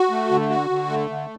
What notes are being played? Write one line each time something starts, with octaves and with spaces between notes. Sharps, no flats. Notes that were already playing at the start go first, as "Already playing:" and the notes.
Already playing: F#4
A3
D3
F#4
D3
A3
D3